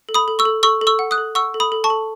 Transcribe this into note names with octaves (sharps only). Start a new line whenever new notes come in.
A4
B5 D#6
A4
C#6 E6
A4
A4 C#6 E6
A4
C#6 E6
F#5
D#6 F#6
A4
F#5 C#6 E6
A4
B5 D#6
A4
A5 C#6
A4